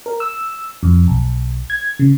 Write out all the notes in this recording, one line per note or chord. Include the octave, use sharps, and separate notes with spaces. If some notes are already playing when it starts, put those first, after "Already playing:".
A#4
E6
F2
B1
G#6
C#3